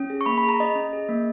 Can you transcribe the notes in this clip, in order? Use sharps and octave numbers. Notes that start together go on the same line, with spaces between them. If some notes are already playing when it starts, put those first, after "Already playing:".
Already playing: C#4
G#4
C#6
A#3 B5
B5
G#4
A#5
C#4 D#5
C#4
G#4
A#3